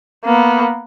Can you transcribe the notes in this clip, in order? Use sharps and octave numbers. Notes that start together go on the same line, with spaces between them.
A#3 B3